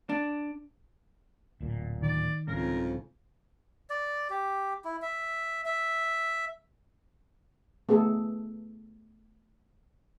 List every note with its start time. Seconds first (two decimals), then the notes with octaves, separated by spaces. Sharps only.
0.09 D4
1.61 D1 A#2
2.03 D#3 D5
2.48 C2 F2 G#2 C#3 A#4
3.90 D5
4.30 G4
4.85 E4
5.02 E5
5.66 E5
7.89 A3 B3 G#4 A4